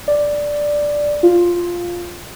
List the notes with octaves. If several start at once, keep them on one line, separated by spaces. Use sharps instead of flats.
D5
F4